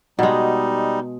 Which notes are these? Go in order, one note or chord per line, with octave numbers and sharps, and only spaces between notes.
B2 G3 G#3 D#4